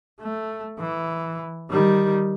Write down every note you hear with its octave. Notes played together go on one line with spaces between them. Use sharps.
A3
E3
D#3 G3